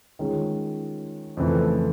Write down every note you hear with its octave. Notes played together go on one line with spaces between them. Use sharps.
D#3 G#3 C#4 F4
F2 C#3 E3 A3